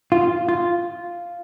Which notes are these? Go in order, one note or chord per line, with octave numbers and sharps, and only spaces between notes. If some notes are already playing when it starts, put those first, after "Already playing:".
F4
F4